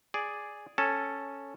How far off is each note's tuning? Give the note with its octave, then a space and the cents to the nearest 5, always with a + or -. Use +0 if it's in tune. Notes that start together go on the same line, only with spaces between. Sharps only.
G#4 +0 D5 +0
C#4 -5 A4 +0 A5 +0